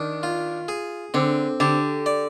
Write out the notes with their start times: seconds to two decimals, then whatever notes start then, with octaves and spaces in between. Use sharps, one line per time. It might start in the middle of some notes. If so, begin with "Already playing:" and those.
Already playing: D#3 D4
0.23 F4
0.68 G#4
1.14 D3 C4
1.60 D3 G4
2.06 D5